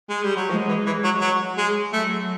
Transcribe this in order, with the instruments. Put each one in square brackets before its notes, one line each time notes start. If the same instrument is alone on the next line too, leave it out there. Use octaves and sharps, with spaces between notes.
[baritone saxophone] G#3
G3
F#3
[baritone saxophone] F3 [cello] G#3
[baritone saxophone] E3
E3
F#3
F#3
G#3
[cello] F#3 [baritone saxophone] A3